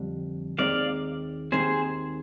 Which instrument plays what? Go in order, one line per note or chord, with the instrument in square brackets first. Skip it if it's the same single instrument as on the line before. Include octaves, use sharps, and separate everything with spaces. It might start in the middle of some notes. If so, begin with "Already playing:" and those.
Already playing: [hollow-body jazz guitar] F2 D3 G3
[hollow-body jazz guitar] D#2 D#3 G#3 C4 [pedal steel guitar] D5 F5
[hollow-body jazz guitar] D#2 D#3 G#3 C4 [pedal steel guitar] G#4 C5